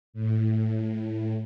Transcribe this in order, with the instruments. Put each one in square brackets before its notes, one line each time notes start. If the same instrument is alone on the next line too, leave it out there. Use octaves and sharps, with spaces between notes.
[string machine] A2